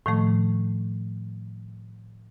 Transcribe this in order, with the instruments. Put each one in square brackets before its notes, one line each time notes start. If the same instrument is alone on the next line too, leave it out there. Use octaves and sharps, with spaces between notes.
[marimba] A2 D#3 F3 A3 C#6